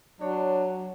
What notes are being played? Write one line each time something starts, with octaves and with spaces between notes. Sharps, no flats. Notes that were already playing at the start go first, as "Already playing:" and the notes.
F#3 D4 F#4 C#5